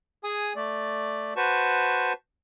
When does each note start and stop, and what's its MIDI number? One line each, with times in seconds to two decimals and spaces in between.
0.24 0.53 68
0.24 0.53 80
0.24 0.53 87
0.56 1.34 57
0.56 1.34 74
1.36 2.13 66
1.36 2.13 71
1.36 2.13 72
1.36 2.13 81
1.36 2.13 85